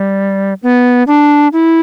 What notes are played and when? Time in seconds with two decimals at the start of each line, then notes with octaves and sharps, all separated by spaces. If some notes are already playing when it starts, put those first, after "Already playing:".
Already playing: G3
0.63 B3
1.07 D4
1.53 E4